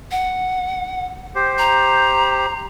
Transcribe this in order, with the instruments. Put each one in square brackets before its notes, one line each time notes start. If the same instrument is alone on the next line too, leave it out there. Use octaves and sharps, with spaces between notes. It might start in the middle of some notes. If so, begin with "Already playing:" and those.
[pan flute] F#5
[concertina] G4 C5
[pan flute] A#5